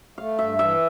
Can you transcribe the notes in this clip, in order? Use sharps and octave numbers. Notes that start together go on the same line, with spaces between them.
A3 F5
G2 E5
E3 E5